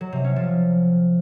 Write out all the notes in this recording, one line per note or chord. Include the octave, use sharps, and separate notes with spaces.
F#3
C3
C#4
F3